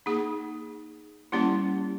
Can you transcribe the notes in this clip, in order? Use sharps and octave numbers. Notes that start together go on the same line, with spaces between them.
A#3 D#4 G#4
G3 A#3 C#4 E4 G4